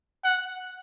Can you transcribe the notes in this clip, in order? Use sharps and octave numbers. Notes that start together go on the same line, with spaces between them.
F#5